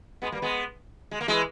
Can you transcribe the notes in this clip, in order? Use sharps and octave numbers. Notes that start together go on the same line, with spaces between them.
G#3 B3
G3 A#3
G#3 B3
G#3
A#3
E3 G#3